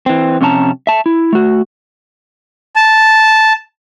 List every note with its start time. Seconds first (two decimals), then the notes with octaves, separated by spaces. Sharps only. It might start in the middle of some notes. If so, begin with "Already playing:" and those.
0.06 E3 C4
0.41 F2 C3 C#4 C5 A5 A#5
0.87 E5 A5
1.06 E4
1.33 A3 F#4
2.76 A5